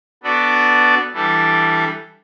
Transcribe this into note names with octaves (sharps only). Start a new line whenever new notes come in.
B3 D4 F#4 A4 D5
E3 G3 D4 A4